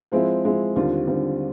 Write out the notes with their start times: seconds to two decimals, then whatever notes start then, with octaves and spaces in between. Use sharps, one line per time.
0.12 F3 G#3 C4 E4
0.44 F3 G#3 C4 E4
0.76 D#2 D3 G3 C4 F4
1.07 D#2 D3 G3 C4 F4